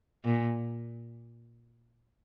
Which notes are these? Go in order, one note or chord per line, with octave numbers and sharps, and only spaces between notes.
A#2